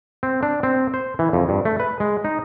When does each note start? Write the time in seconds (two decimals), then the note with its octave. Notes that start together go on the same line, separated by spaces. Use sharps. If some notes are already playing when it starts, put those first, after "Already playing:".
0.23 C4
0.43 D4
0.63 C4
0.94 C5
1.19 E3
1.33 F2
1.49 G2
1.65 A3
1.80 B4
2.00 G#3
2.25 D#4